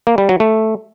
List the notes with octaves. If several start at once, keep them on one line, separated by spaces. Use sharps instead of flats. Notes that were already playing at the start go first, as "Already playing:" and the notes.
A#3
G3
F#3
A3